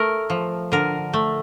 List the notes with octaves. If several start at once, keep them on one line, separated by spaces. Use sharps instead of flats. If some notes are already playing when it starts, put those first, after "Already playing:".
Already playing: A3 A#4
F3
D3 A#4
A3